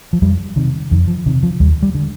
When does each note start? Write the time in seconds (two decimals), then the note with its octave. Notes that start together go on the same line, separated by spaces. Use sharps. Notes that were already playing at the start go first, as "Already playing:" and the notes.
0.13 F3
0.22 F2 G3
0.56 C3 D#3
0.91 F2 D#3
1.08 F3
1.26 C3 D#3
1.43 F3
1.60 D#2 G3
1.83 G3
1.95 D3